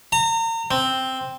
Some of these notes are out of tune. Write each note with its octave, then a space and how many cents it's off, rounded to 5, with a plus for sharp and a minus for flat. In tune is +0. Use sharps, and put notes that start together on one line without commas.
A#5 -35
C4 +0